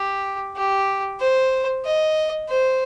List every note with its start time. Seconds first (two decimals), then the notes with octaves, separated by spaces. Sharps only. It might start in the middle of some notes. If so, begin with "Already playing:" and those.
Already playing: G4
0.57 G4
1.20 C5
1.85 D#5
2.49 C5